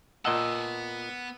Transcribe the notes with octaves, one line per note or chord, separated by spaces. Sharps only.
A#2 B3 D#5 F#5 A5 E6